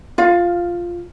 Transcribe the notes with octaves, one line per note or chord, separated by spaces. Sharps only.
F4 F5